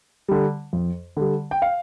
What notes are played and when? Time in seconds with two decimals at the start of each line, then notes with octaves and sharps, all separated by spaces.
0.29 D3 G3
0.73 F2
1.17 D3 G3
1.51 G5
1.62 F5